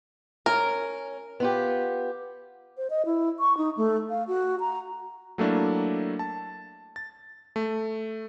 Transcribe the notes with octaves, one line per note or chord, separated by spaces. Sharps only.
C#4 A#4
B3 F4 G4
C5
D#5
E4
C#6
D#4
A3
F5
F#4
A#5
F#3 A3 A#3 D4 E4
A5
A6
A3